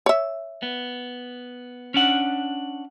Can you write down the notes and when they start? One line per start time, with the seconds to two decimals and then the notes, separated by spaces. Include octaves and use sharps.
0.06 C#5 E5
0.63 B3
1.94 C#4 D4 F#5